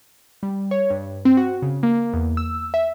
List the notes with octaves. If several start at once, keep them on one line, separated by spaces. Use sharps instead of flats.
G3
C#5
G2
C4
F#4
C#3
A#3
E2
E6
E5